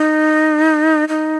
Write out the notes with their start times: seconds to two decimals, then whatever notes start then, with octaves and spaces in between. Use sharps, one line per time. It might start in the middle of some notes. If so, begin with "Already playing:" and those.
Already playing: D#4
1.09 D#4